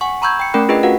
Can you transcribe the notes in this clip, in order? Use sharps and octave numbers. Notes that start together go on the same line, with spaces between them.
F#5 G#5 C#6
A#5 B5 C#6 E6 G6 G#6
G5 C#7
A3 C#4 A#4 G5 B5 F#6
D4 F4 G#4 B4 D#5 G5
F4 F#4 B4 F5 F#5